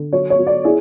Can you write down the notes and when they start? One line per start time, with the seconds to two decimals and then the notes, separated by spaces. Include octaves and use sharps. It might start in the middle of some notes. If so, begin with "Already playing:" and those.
Already playing: D3
0.13 F#3 C#5
0.30 C#5
0.39 F#3
0.47 D5
0.64 E4 G#4